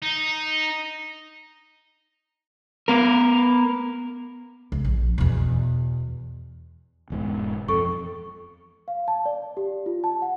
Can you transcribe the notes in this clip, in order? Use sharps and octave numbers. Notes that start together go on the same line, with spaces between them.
D#4
B3 A#4
C#2
A#1
E2 B2
E1 E2 G#2
F2 A4 C#6
F5
A5
D5
G4
F4
A5
F#5